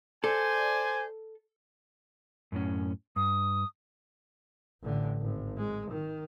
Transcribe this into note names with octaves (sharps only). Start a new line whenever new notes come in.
A4 C5 D5 G#5
F#2 A2 C#4
G2 D#6
A1 D3
G#1
G#3
D#3